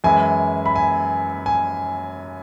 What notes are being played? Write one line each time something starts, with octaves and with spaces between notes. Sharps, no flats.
F#2 E3 G#3 E4 G#5
B5
G#5
G#5